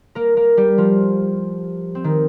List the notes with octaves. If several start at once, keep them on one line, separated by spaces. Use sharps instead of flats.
A#3 A#4
A#3 A#4
G3 G4
F3 F4
C4
D#3 D#4